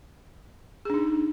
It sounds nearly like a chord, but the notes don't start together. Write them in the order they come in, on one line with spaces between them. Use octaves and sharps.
G#4 D4 D#4